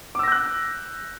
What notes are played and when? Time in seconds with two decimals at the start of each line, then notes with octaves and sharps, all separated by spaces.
0.15 D6
0.19 E6
0.23 A#6
0.28 G6
0.32 F#6